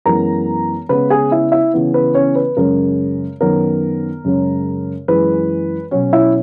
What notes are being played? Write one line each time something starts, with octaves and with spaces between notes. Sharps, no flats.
F#2 E3 G#3 B3 A#4 A#5
C#3 G#3 B3 B4 B5
G#4 G#5
E4 E5
E4 E5
C#3 E3 B3
B4
C#4 C#5
B4
F#2 C#3 G#3 C#4 A#4
F#2 D#3 F#3 B3 A#4
F#2 C#3 G#3 C#4
F#2 E3 G#3 B4
B2 F#3 C#4 C#5
E4 E5